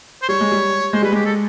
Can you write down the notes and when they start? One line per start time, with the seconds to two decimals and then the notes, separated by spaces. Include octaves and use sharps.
0.22 C5
0.29 G3 C#5
0.41 G#3
0.52 G3
0.93 G#3 C5
1.02 G3 B4
1.12 G#3 G4
1.25 A4